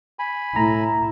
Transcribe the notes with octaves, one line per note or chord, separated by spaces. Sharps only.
G#5 B5
A2 E4 A#5